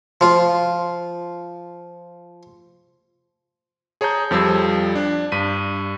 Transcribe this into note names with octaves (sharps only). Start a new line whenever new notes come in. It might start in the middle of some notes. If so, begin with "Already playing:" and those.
F3 F4
G#4 C#5 A5 A#5 G6
F2 F3 G3 E6 G#6
D4
G2 B6 D#7